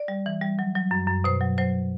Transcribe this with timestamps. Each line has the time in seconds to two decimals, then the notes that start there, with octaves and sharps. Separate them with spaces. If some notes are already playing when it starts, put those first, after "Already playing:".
Already playing: D5
0.08 G3
0.26 E3
0.41 G3
0.59 F#3
0.76 F#3
0.91 F#2
1.08 F#2
1.24 B2 C5
1.41 F#3
1.58 F#3 C5